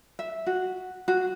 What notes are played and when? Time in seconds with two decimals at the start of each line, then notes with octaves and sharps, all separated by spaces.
0.19 E5
0.47 F#4
1.08 F#4